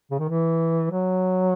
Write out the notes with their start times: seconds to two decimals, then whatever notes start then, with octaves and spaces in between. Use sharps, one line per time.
0.11 C#3
0.19 D#3
0.29 E3
0.91 F#3